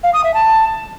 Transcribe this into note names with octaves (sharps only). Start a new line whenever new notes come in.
F5
D#6
E5
A5